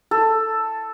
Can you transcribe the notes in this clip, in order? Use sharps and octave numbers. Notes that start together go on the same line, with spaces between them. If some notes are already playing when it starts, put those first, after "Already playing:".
A4